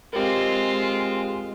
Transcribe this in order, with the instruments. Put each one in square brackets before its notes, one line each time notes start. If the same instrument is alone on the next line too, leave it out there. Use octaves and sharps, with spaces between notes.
[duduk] G#3 [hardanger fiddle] C4 F4 [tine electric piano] G4 A#4